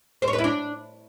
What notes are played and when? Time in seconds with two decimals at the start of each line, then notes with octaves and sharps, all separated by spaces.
0.22 C5
0.28 C#5
0.33 B4
0.39 E4
0.44 D4